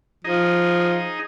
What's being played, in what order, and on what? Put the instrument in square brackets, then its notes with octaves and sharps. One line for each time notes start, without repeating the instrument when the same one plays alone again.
[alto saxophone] F3 [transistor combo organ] D#4 G#4 D#5